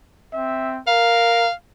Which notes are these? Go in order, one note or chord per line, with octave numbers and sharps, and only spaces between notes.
C4 E5
A#4 F5